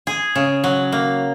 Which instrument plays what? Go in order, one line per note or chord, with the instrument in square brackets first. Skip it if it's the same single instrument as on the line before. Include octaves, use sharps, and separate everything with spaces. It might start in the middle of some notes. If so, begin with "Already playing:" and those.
[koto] G#4
C#3
F#3
A#3